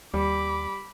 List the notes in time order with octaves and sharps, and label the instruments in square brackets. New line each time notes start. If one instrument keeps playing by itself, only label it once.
[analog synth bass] D#2 [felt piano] G3 [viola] B5 D6